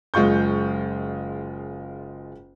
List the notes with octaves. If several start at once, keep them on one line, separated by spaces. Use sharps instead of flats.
F#1 G#3 F4 C#6 G6